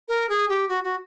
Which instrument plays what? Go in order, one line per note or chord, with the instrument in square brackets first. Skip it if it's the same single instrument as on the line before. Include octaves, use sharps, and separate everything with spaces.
[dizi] A#4
G#4
G4
F#4
F#4